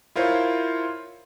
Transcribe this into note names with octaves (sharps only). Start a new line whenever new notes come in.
E4 F4 A#4 C5 C#5